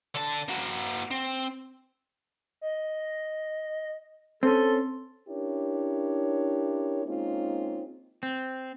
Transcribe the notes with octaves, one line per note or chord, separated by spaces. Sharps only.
D3 A5
A#3 F#4
C4
D#5
C4 C#4 A4 C6
C#4 D4 E4 G4 A#4 C#5
G#3 A#3 C4 C#4 D#4 F4
C4